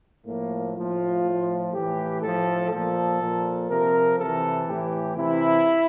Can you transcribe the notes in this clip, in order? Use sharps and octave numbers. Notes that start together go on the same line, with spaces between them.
A2 F3 A#3
A2 F3 F4
A2 F3
A2 E3 G4
A2 F3 A4
A#2 F3 A4
A#2 F3
C3 F3 A#4
C3 E3 A4
A2 E3 G4
C3 E3 E4